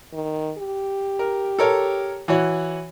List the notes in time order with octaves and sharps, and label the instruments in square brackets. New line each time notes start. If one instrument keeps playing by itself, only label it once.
[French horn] D#3
G4
[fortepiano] A#4
A4 A#4 C#5
E3 F#4 C#5